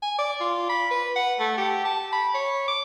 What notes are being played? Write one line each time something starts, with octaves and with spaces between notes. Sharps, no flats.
G#5
D5
F4
B5
B4
F#5
A3
G4
A5
B5
C#5
D6